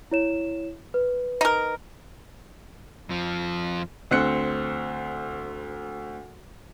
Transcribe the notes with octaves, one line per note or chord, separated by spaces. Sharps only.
E4 C#5 E7
B4
D#4 A#4
F2 F3
D2 C4 F#6 C#7